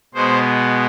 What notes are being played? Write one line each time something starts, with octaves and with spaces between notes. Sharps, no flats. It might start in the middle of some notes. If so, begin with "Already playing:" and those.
B2 G#3 B3 C5